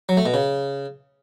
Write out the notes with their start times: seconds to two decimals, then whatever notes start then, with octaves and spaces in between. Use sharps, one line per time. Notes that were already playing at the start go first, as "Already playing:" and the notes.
0.09 F#3
0.17 A3
0.26 B2
0.34 C#3